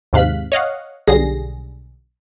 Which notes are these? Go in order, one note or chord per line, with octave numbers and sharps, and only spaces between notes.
D#2 G#2 C3 F5 F#6 B6
C#5 D#5 F5 F#5
B1 D3 G3 G#4 A#6 C7